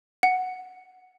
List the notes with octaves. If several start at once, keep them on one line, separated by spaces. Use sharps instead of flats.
F#5